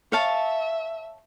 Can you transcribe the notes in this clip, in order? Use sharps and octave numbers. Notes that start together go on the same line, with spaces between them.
C#5 E5 F5 A5